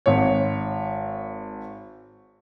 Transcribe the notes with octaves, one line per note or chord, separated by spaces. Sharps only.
G#1 C#5